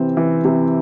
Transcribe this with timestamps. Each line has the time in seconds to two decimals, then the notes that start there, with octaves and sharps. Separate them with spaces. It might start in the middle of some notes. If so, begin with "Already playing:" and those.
Already playing: C3 E3 C4
0.17 E3
0.45 C3